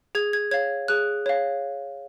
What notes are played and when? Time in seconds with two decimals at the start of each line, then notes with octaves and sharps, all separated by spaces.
0.15 G#4 G#6
0.33 G#6
0.51 C#5 F5 G#6
0.88 G#4 F#6
1.26 C#5 F5